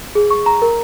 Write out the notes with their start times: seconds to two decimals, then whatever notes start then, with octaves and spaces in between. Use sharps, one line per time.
0.15 G#4
0.30 C#6
0.46 A#5
0.62 A#4